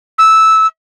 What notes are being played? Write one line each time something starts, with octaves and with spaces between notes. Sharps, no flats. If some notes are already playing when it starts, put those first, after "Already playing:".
E6